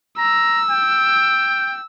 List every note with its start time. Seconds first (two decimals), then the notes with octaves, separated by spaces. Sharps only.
0.18 A#5 E6
0.71 G5